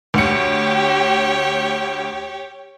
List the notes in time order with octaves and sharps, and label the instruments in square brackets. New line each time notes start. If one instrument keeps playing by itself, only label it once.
[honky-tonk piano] D2 C#7 [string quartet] G4 C#5